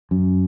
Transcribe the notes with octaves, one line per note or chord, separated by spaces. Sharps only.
F#2